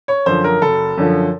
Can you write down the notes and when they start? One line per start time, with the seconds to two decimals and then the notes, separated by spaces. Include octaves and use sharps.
0.08 C#5
0.26 F#2 D3 F3 C5
0.44 A#4
0.62 F#1 A4
0.98 F#2 D3 F3